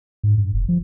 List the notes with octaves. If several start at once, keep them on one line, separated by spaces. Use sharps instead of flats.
G#2
G2
F1
F3